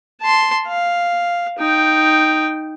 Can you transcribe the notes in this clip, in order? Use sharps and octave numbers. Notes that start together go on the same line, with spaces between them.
A5 C6
F5
D#4 G5